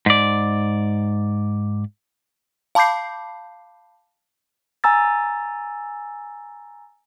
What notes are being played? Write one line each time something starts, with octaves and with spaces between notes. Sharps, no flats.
G#2 D5
F5 A5 B5 D6 G6 C7
G#5 A#5 E6 A6